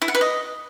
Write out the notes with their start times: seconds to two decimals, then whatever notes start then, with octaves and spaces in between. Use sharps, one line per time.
0.02 E4
0.08 F#5
0.15 B4
0.21 D#5